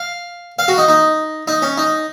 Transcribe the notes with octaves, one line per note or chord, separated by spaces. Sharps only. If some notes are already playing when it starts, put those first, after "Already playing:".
Already playing: F5
F5
F#4
D#4
D#4
D#4
C#4
D#4